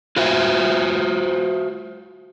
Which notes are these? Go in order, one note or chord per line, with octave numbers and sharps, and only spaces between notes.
F4 F#4 C5 E5